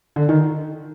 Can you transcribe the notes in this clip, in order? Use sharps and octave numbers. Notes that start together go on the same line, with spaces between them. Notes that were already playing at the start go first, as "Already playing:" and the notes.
D3
D#3